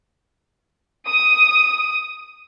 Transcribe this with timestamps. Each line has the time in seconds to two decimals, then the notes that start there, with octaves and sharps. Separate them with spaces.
1.08 D#6